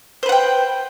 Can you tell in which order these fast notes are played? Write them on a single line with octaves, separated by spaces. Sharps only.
C5 B4 F#5 G5